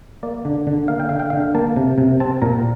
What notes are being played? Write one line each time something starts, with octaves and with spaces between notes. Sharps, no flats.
A#3 D5
D3
D3
A#3 F5
G5
D3 F5
G5
F5
D3
A#3 A5
C3
C3
C4 A5
A#2 A#5